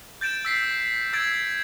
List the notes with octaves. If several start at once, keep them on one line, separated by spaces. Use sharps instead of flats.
G6 A6 D7 E7
E6 B6 C7
E6 G#6 A6 D7